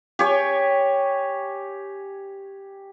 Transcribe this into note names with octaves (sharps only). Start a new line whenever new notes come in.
G4 C#5 G#5